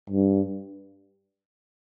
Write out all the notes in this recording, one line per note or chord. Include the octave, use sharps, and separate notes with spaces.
G2